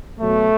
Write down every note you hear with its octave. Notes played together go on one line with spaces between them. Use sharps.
B2 F#3 A3